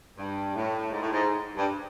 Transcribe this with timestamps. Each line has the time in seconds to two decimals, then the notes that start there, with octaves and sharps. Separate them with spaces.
0.17 G2
0.54 A2
0.91 G#2
1.01 A2
1.12 G#2
1.57 G2